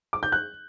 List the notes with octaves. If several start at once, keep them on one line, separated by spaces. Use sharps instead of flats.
D6
G6
F#6